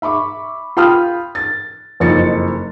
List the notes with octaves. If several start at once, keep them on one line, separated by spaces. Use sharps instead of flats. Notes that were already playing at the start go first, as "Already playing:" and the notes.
E5 B5 C#6 D6
F4 G5 B5 D#6 F6
A6
F#1 F2 D#4 A6 C#7